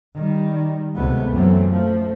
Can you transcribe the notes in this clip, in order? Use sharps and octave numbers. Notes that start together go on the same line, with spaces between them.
D#3 G3
C#2 C3 A3 B3
F#2 E3 F#3 A3 C4
F3 A3